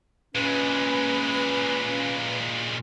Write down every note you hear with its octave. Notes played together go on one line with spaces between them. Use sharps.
A#2 G#3 C#4 B4